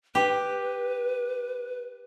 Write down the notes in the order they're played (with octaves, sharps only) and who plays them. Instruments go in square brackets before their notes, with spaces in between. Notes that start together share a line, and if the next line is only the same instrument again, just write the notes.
[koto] G4 [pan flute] B4